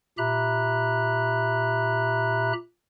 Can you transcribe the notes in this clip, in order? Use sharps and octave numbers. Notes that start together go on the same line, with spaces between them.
A#2 G4 E5 A#5 B5 F#6